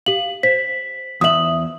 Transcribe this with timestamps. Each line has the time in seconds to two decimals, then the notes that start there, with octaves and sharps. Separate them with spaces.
0.06 G4 F5 F#7
0.43 C5 B6
1.21 E2 E5 D#6 F#7